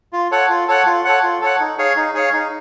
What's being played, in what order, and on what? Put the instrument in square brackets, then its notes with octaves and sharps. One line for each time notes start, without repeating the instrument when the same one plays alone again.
[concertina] F4
A4 C#5 F#5
F4
A4 C#5 F#5
F4
A4 C#5 F#5
F4
A4 C#5 F#5
D#4
G#4 C#5 F5
D#4
G#4 C#5 F5
D#4